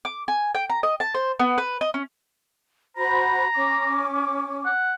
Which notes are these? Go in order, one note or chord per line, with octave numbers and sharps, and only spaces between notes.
D6
G#5
G5
A#5
D#5
A5
C5
B3
B4
D#5
C#4
F#4 C5 A#5 B5
C#4 D6
F#5